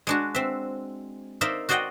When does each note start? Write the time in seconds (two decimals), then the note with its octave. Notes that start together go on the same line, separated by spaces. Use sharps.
0.07 G#3 D4 F#4
0.35 C4 E5
1.41 D#4 A#4 C5 D5 E5 F5
1.69 F#4 C5 D5 D#5 F#5 G5